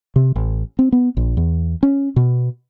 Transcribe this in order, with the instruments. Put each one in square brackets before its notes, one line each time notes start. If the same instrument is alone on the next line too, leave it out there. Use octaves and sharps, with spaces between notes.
[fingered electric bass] C3
A1
C4
B3
A#1
E2
C#4
B2